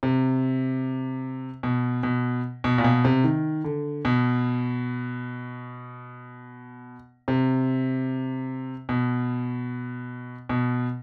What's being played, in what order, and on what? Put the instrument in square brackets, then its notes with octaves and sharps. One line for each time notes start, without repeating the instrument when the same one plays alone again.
[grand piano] C3
B2
B2
B2
A#2
B2
C3
D#3
D3
B2
C3
B2
B2